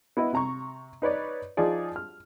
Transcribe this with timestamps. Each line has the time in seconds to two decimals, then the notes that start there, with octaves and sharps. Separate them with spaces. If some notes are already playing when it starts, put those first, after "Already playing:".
0.17 B3 E4 D#5
0.33 C3 A#5 C#6
1.02 D#4 B4 C#5 D5
1.57 F3 D#4 F4 G#4 D5
1.96 F6